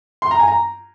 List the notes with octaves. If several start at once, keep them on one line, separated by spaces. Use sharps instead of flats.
C6
A#5
G#5
A#5